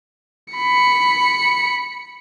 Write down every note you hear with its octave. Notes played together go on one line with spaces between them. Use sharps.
B5 C#7